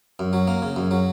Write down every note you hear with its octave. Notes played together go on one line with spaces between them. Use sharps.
F#2
F#3
A#3
C#3
F#2
F#3